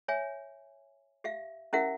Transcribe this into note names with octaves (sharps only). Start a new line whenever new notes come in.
C#5 E5 G#5
G4 E5 F5
C#4 E4 G4 A#4 E5 F#5